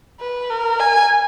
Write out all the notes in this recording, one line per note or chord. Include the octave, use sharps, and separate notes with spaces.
B4
A#4
G#5